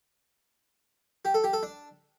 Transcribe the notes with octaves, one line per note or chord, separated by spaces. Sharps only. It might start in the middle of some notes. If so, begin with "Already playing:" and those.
G4
A4
G4
A4
D4